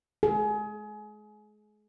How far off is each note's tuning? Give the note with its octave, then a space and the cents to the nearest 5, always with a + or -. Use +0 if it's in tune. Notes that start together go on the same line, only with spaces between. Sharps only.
G#4 +30